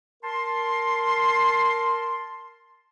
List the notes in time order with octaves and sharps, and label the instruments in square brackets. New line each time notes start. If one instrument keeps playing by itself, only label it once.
[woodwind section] A#4 A5 C6